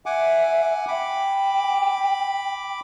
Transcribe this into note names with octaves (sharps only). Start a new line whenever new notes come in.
E5 F#5 G#5 D6
G5 B5 D6